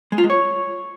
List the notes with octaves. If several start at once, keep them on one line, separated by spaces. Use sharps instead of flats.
G#3
F4
G#3
C#5